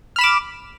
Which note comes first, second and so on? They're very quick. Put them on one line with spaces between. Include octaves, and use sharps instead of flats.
F6 B5 E7 D6